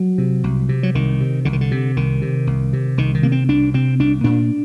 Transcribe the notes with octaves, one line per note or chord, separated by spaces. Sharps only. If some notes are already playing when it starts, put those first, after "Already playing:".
Already playing: F#3
C3
C2
C3
F#3
C2 D#3
C3
C2 D3
D#3
D3
C3
C2 D#3
C3
C2
C3
C2 D#3
D#3
C3 A#3
C4
C2 D4
C3 C4
C2 D4
A#2 D4